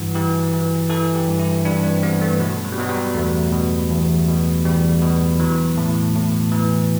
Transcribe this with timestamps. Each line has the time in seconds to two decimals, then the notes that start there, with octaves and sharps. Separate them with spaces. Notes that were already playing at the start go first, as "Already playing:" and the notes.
Already playing: G2 E3 F#4
0.15 E3 G4
0.53 E3
0.89 E3 A4
1.15 G4
1.28 G2
1.39 E4
1.65 G2 D4
1.83 C4
2.02 G2 B3
2.21 A3
2.40 B2 F#3
2.64 F#3
2.72 G3
2.77 B2 F#3
2.89 G3
3.15 E2 A3
3.53 B2
3.90 E2
4.28 B2
4.65 E2 G3
5.02 B2
5.40 E3 F#3
5.77 A2
6.15 A2
6.51 E3